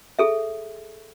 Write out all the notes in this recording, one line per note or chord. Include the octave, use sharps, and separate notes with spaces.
G#4 A4 E5